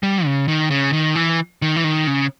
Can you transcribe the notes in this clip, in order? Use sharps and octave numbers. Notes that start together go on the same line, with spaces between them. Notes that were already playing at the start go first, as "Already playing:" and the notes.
G3
C#3
D#3
C#3
D#3
E3
D#3
E3
D#3
C#3